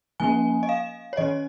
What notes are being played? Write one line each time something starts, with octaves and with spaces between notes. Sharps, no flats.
F3 A#3 C#4 G#5
D#5
F5
C#5
D#3 C#4 D#5